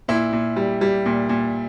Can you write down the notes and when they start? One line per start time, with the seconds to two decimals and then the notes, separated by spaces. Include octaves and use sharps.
0.08 A#2 E4
0.32 A#2
0.56 G3
0.81 G3
1.06 A#2
1.29 A#2